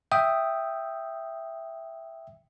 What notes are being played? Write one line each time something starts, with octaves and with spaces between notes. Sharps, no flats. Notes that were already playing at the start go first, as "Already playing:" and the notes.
E5 G5 D#6